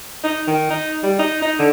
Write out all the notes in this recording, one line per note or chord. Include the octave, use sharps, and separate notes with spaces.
D#4
D#3
D#4
G3
D#4
D#4
D3